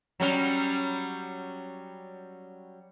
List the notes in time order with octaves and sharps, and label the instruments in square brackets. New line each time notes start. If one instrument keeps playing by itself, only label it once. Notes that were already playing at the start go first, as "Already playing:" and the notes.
[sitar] F#3 G3 C#4